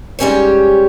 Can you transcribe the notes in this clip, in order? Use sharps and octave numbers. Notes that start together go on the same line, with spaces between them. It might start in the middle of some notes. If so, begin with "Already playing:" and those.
G#2 G3 C#4 G4 C#5